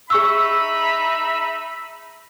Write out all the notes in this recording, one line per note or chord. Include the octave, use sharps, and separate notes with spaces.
D#4 G#4 E5 B5 C#6 E6